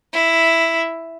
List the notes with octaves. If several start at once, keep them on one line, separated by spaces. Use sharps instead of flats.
E4